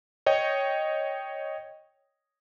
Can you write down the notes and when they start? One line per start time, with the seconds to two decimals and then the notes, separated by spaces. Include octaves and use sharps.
0.26 C#5 D#5 G5